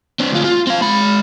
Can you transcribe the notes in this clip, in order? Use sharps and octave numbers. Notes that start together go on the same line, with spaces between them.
C4 D4
D2 F4
F4
C4 F5
G#3 B5